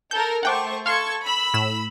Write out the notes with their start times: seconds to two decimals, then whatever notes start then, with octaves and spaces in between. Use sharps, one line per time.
0.11 A4 A#4 G6
0.43 A3 C5 F#5 G5 C#6 D6
0.86 A4 F5 C6 C#6 G#6
1.24 B5 E6
1.54 A2 E7